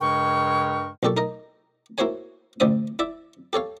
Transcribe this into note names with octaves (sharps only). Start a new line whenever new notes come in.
G2 C#3 G#3 A#4 G5 C#6
B1 A#2 G4 A4 C#6
D#4 A#4 D#5
A#3 E4 F#4 C5 C#5 G#5
A1 D2 C5 D5 E5 D#6
E4 D5 E5
G4 A4 C#5 F5